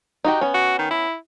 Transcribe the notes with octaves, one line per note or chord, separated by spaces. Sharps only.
D#4 F#4 G4
B3 C#4
F#4
D#3
E4